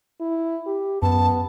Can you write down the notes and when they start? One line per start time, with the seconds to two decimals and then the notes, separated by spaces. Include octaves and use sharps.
0.21 E4
0.67 G4
1.02 F#2 B3 A5